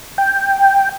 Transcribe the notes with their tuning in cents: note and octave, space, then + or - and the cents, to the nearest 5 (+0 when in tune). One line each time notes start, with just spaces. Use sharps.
G5 +5